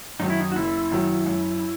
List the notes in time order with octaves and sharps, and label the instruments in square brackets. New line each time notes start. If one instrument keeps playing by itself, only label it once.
[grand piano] F#2 D#3 F#3 [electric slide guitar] D#4
[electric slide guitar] E4
D#4
F#4
[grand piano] F#1 [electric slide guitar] E4
[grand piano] F#2 D#3 F#3
F#2